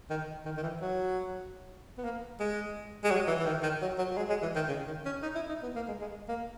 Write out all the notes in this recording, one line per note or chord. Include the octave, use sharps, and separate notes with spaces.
D#3
D#3
D#3
E3
F#3
B3
A#3
G#3
G#3
F#3
E3
E3
D#3
D#3
F#3
F#3
F#3
G#3
G#3
E3
D#3
C#3
D#3
C#4
D#4
E4
D#4
B3
A#3
G#3
G#3
A#3